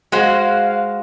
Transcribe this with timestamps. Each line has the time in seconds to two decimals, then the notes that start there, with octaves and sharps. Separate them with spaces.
0.12 G#3 F#4 C5 F5